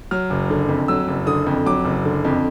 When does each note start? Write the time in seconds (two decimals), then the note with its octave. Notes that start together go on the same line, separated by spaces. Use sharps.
0.11 F#3 F6
0.30 F#1
0.50 D3
0.68 F2
0.88 F#3 E6
1.08 F#1
1.27 D3 D#6
1.46 F2
1.66 F#3 D6
1.85 F#1
2.05 D3
2.25 F2